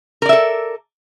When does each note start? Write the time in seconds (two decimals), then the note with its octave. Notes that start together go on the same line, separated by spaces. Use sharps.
0.22 A#4
0.26 D5
0.29 E5
0.33 A4